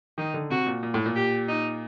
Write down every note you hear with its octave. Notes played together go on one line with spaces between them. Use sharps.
D#3 D#4
D3
C3 F#4
A#2
A#2
A2
A#2
G4
D#4